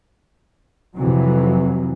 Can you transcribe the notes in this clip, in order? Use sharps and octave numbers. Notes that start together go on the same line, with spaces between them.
F2 C3 E3 F#3